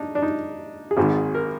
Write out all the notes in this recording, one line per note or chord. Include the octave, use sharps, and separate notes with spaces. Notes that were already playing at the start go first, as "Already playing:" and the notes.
Already playing: D4 D#4
D4
D#4
G#4
G#1 G#2 D#3 F#4
A#4